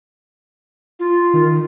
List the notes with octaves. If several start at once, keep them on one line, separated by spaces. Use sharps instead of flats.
F4
D#3